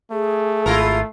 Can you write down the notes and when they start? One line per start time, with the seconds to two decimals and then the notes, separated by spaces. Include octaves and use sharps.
0.12 A3 G#4
0.66 G#1 E4 F4 A#4